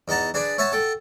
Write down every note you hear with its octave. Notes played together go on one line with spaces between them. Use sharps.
E2 D#4 F#5 A5 A#5
D4 G#4 B4 D5
C#5 E5 F#5 G#5 A5
A4 F#5 G5